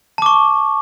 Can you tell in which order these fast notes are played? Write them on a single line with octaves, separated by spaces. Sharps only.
A5 D6 C#6